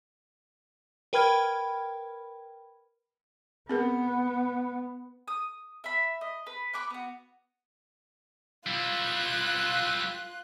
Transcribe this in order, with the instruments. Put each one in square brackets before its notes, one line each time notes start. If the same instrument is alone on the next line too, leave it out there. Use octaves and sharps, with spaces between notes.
[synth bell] A#4 B4 G5 B5 F6 G#6
[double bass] B3 [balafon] C4 G#4 A#4
[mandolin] D#6
E5 B5
D#5
B4
B5 C#6 D6 F#6
B3 F#4
[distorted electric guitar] G3 E4 [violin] F4 F#6